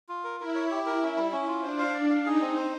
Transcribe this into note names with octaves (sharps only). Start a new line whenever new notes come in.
F4
A#4
E4 A#4
C#5
G4
A#4
C#4
G3
C#4
F4
D4 C5
F5
D4 D5
F5
D#4 G#4
C4
C5